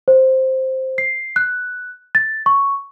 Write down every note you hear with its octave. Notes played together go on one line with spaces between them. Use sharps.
C5
C7
F#6
A6
C#6